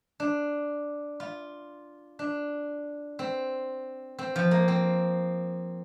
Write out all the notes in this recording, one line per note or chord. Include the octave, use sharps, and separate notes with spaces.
D4
F4
D4
C4
C4
F3
A#3
C4